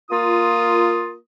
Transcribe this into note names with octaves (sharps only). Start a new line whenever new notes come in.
A#3 F4 D#6